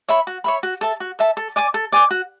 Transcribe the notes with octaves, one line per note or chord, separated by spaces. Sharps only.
C#5 E5 B5
F#4
C#5 E5 B5
F#4
A4 E5 A5
F#4
A4 E5 A5
A4
D5 G#5 D6
A4
D5 G#5 D6
F#4